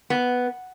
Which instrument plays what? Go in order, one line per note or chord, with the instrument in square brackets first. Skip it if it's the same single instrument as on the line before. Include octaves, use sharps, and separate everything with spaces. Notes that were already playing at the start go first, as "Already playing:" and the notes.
[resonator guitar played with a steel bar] B3